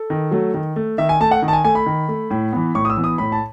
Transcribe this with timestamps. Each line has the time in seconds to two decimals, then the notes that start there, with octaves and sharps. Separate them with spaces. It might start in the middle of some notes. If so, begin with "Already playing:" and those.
Already playing: A4
0.10 D#3
0.31 F#3 A3
0.54 D#3
0.76 A3
0.98 D#3 E5
1.09 G#5
1.20 A3 A5
1.31 F#5
1.42 D#3
1.48 A5
1.53 G#5
1.64 A3 G#5
1.75 B5
1.86 D#3
2.08 A3
2.30 A2
2.53 E3 B3
2.75 A2 C#6
2.85 D#6
2.90 E6
2.97 E3 B3
3.04 D#6
3.18 A2 B5
3.32 A5